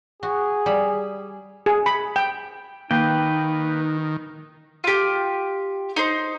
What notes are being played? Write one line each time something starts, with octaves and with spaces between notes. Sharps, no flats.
F#4 G#4
G3 B5
G#4
B5
G5
D#3 A#3 D#4 B4 G5
F4 G4
D#4 C5